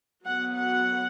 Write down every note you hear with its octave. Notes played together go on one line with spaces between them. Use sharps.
F#3 B3 F#5
F#5